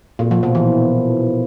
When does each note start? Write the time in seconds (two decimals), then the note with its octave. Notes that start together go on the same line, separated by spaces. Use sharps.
0.19 A#2
0.31 F3
0.43 B2
0.55 E3